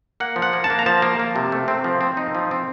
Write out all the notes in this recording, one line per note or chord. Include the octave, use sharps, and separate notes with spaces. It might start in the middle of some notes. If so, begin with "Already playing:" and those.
A#3 F#5
F3
F#5
A#3
A5
A#3
A#5
F3 A5
A#3
A#3
C3
A3
C4
F3
C4
D#4
F3
C4